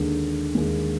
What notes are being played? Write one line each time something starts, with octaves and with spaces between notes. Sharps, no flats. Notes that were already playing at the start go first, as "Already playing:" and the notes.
Already playing: D#2 D3 G#3
D#2 D3 G#3